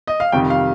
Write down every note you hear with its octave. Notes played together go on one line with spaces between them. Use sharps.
D#5
F5
F2 C3 D#3 G3 G5
F5